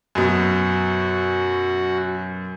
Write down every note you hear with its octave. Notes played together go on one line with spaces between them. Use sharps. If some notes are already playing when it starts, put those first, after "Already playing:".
F#2 B2 F#4